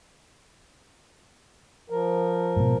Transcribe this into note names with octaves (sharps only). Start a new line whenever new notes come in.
F3 A#4
G#2 B2